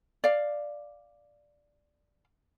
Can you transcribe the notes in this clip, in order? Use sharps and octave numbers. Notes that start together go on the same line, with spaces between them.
D5 F5